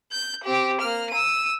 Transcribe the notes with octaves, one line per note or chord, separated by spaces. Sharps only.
G6
C4 G4
A#3 F6
E6 D#7